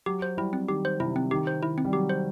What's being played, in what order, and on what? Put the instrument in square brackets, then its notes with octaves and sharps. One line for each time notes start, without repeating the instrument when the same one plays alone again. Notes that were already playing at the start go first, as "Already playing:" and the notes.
[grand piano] F#3 [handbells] G4
[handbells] C5
[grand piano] G3 [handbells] E4
[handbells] C4
[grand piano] D#3 [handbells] G4
[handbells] C5
[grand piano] C3 [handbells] E4
[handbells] C4
[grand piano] D#3 [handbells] G4
[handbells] C5
[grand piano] D#3 [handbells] E4
[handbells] C4
[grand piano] G3
[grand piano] F#3 [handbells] G4
[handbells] C5